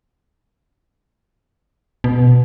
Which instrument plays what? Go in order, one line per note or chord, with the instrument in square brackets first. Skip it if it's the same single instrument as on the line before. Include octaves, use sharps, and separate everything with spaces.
[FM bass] B2